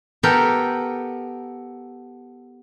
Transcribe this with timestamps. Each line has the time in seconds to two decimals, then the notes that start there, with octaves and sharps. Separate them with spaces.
0.23 B3 G4 A4 A#4 G5